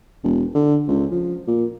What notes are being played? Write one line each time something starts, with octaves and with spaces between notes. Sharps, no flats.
E1
D3
C#2
F3
A#2